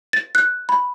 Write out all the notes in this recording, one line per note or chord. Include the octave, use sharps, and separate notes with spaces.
A6
F#6
B5